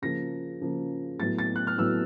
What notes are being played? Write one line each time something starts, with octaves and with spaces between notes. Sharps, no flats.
C#3 F3 A#3 A#6
C#3 F3 A#3
A2 F#3 B3 A6
A6
F#6
F6
A2 F#3 B3 E6